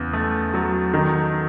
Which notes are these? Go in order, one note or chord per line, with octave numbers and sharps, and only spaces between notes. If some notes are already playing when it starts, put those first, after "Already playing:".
Already playing: E2 C#3
A3
F#3
D#3